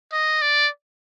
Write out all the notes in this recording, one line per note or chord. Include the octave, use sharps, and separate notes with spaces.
D#5
D5